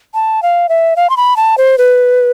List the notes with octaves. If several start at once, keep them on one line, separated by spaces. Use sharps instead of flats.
A5
F5
E5
F5
C6
B5
A5
C5
B4